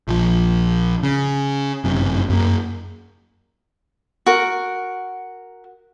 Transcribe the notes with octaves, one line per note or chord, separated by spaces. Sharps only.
A#1 F3
C#3
G1 F#2 C3
F#2 A#3
F#4 A#4